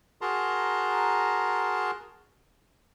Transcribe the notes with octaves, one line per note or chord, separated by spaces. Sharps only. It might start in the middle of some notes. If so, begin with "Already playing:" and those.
F#4 G#4 A#4 A5 A#5 C6